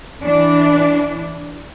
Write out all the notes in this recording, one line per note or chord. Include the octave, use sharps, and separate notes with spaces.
E3 D4